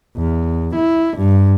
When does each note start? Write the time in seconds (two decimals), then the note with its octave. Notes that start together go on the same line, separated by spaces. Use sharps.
0.16 E2
0.75 E4
1.17 G2